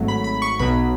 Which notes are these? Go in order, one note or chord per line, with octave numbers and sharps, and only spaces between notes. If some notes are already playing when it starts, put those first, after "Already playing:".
Already playing: G#1 G#2 F#3 A3
B5
B5
C#6
B1 B2 F#3 B5